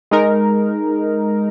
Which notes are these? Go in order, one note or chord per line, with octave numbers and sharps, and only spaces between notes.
G#3 D#4 A#4